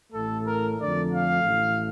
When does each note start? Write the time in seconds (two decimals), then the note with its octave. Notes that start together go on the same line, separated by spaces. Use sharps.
0.11 A1 A2 A3 A4
0.45 A#4
0.78 F2 D3 A3 D5
1.11 F5
1.44 A1 A2 A3